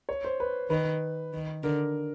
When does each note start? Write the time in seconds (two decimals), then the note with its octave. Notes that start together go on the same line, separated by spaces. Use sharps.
0.09 C#5
0.24 C5
0.40 B4
0.70 D#3 B4
1.33 D#3
1.63 D3 A#4